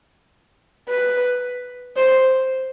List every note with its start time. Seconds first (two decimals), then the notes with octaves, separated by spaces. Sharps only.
0.89 B4
1.97 C5